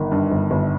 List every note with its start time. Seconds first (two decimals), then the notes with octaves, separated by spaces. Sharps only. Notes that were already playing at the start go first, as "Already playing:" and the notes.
Already playing: G1 D#3
0.11 G2
0.32 G1
0.51 G1